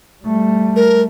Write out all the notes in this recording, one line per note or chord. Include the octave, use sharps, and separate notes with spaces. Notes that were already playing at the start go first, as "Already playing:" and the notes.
G3 A3
A#4